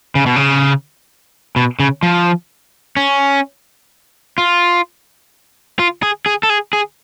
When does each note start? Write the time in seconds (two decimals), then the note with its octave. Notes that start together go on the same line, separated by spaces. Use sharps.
0.15 C#3
0.26 B2
0.36 C#3
1.56 B2
1.80 C#3
2.03 F3
2.97 C#4
4.38 F4
5.79 F4
6.03 G#4
6.26 G#4
6.43 A4
6.50 G#4
6.73 G#4